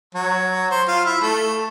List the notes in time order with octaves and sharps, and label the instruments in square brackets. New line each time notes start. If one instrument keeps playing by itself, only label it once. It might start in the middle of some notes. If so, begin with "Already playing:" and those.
[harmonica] F#3
C5
F4
E4
A3